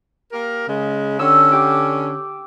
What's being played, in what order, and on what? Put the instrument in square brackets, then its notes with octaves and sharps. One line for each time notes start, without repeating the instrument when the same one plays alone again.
[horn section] A#3 G4 A#4
C#3 G#3
[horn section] D3 C#4 [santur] G4 E6
[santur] G4 D6